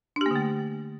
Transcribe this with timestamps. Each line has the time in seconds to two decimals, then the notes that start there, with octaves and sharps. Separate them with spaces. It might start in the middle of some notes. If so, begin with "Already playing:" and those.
0.16 D4
0.21 G4
0.26 A#3
0.31 D3
0.36 A3